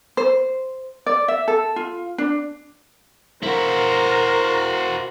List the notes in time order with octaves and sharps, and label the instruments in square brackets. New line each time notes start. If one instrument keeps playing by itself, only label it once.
[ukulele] C5
D5
E5
A4
F4
D4
[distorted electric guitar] E4 F#4 [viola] A#4 A#5 [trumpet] C5